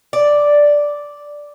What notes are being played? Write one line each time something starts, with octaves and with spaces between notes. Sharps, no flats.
D5